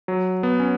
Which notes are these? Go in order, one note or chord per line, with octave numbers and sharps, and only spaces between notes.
F#3
B3
C#4